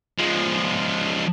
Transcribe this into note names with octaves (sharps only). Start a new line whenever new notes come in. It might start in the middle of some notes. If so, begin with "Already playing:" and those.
F3 G#3